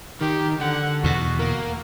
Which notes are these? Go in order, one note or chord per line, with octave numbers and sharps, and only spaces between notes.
D#3 G4
D3 F#5
E2 B2 F#4
A#3